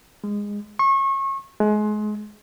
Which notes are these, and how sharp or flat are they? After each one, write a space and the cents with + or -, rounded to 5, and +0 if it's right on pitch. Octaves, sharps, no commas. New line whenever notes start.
G#3 -15
C#6 -30
G#3 +30